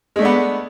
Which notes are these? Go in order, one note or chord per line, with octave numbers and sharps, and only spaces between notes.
G#3 A3 B3 D4